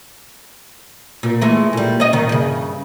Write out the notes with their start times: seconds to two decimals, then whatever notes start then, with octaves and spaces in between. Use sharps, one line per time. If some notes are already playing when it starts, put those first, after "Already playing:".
1.23 A#2
1.41 E3 G#3 A3
1.73 A#2 G3
2.00 C#4 D#5
2.13 A#2 D#3
2.29 G2 C#3